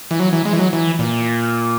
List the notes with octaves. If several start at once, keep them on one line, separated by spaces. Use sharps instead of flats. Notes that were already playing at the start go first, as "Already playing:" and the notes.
E3
F#3
E3
G#3
E3
F#3
E3
A#2